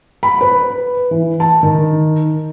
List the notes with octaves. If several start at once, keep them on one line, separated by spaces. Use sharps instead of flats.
B5
B4
E3
A5
D#3